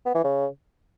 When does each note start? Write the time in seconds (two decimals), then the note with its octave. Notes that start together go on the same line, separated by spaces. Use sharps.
0.06 B3
0.15 E3
0.24 C#3